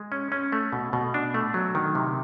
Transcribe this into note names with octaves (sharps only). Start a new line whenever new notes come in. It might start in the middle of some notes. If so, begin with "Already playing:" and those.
Already playing: G#3
C#4
C#4
A3
B2
B2
D4
A3
F#3
D#3
C3